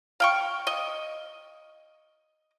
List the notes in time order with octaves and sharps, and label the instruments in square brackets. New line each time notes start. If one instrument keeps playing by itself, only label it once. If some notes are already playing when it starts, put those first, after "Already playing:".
[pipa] F5 G5 C#6
D#5